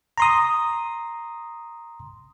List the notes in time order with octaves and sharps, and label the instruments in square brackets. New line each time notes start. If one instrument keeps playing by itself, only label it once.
[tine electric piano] A#5 C6 D#6